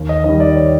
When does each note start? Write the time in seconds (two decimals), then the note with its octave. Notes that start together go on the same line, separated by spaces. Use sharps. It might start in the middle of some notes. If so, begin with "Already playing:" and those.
Already playing: D#2
0.09 D#5
0.24 D#3 G3 D#5
0.40 D5
0.56 C#5